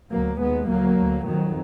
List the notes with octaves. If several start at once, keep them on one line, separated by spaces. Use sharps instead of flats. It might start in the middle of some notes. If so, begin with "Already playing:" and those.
D2 F#3 A#3
D#2 G#3 B3
D2 F#3 A#3
D2
F2 D#3 F#3